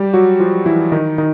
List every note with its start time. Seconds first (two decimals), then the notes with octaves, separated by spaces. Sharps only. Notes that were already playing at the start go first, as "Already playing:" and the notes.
Already playing: G3 G4
0.14 F#3 F#4
0.40 F3 F4
0.66 E3 E4
0.92 D#3 D#4
1.18 D#3 D#4